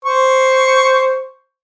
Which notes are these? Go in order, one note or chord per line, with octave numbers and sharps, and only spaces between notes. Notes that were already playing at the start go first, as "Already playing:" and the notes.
C5 C#6